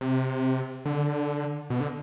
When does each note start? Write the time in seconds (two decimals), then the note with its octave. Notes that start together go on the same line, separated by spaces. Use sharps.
0.01 C3
0.85 D3
1.70 B2
1.80 D3